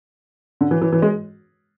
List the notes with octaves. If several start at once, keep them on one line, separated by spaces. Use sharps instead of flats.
D3
E3
E3
E3
G#3